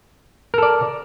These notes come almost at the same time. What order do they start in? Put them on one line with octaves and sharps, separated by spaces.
A#4 A4 D5